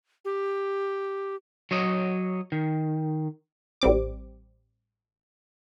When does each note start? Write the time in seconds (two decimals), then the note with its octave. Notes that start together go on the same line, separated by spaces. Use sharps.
0.25 G4
1.71 F#3 C#5 D#5
2.52 D#3
3.82 A1 G3 C4 D6